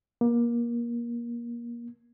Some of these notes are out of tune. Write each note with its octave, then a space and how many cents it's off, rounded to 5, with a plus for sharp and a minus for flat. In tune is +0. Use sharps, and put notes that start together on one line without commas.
A#3 +25